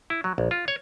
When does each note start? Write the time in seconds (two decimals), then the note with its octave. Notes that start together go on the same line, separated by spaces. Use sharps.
0.10 E4
0.24 F#3
0.38 A#1
0.51 F4
0.68 C#5